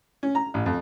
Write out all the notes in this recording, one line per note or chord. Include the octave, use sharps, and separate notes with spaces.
C#4
A#5
A1
F2